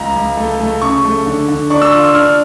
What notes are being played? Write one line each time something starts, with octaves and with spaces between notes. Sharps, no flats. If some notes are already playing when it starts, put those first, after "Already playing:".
Already playing: C#2 A#5
C#2
A3
A3
C#3 C#6
A3
D3
D3
D4 C#6
E6
F4
E6
D4 F6